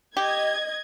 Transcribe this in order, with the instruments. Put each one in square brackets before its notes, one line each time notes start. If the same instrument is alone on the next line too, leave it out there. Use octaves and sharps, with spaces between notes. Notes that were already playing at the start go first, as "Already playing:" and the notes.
[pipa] G4 [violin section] D#5 G#6